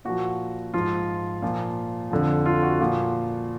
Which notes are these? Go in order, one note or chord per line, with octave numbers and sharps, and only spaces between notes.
A#2 F3 F#4
G#2 F3 F4
A#2 F3
F2 D3 F3
F4
F#4
A#2 F3